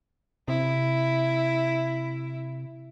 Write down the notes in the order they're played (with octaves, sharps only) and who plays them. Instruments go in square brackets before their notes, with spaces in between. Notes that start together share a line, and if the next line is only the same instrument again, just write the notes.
[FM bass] C3 [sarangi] E4